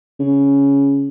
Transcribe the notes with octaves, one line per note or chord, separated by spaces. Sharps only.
C#3